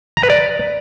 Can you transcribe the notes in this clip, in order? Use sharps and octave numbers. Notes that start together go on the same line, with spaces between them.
A#5
B4
D5